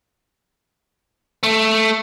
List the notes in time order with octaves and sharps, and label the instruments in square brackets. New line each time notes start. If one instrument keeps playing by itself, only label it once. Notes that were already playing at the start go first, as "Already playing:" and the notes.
[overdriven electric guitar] A3